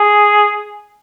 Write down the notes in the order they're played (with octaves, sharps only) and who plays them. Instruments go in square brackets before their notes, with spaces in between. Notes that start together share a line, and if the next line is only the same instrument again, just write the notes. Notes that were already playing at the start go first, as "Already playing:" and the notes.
Already playing: [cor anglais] G#4